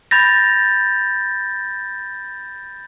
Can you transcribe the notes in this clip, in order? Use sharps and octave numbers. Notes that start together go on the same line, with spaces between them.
B5 G6 A6 A#6